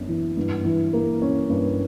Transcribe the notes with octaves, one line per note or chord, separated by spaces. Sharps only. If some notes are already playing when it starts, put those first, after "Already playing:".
Already playing: F#2 B3 D4
E3
G2
E3
A#3
C#4
G2